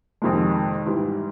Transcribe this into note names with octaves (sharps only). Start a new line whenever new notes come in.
F2 C3 D#3 G#3
G#2 E3 G3